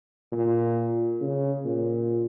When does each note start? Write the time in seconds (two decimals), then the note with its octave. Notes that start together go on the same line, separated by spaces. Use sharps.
0.32 A#2
1.20 C#3
1.65 A#2